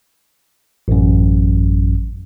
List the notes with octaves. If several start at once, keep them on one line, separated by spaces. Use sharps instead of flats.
A1 F#2